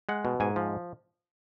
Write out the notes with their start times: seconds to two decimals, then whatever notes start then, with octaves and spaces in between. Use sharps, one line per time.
0.09 G#3 F#5
0.25 B2
0.40 G#2 G#5
0.56 F3